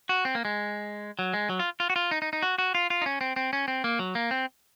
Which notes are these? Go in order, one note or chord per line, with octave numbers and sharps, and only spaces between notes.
F#4
C4
A#3
G#3
F#3
G#3
F#3
F4
F4
F#4
F4
D#4
D#4
D#4
F#4
F#4
F4
F4
D#4
C#4
C4
C4
C#4
C4
A#3
F#3
A#3
C4